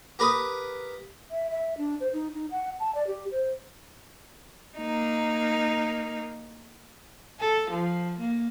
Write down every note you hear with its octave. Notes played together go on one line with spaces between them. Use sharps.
G4 A#4 B4 B5 D#6
E5
E5
D4
C5
D#4
D#4
F#5
A5
D5
G4
C5
A#3 D#4
A4
F3
A#3